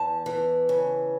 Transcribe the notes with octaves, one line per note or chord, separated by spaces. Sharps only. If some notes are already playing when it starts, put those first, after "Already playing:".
Already playing: E2 A5
E3
C#3